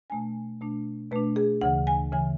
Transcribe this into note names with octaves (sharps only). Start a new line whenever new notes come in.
B2 A3 D4 G#5
B2 A3 D4
B2 A3 D4 B4
G#4
D2 C#3 E3 F#5
G#5
C#3 E3 G#5